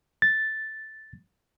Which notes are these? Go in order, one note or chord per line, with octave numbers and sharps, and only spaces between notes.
A6